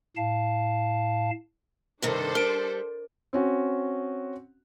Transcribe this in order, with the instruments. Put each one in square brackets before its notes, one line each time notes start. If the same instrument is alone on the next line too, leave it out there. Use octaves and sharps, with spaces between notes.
[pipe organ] A2 F5 A5
[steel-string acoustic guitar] G2 C3 D#3 [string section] D4 A4 C5
[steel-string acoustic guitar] G3 [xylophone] A#4 D7
[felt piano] C4 C#4 F#4